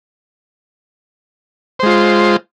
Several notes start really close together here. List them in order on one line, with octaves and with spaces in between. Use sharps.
C5 G#3 F4